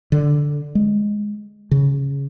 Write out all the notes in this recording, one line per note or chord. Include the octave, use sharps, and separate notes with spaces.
D3
G#3
C#3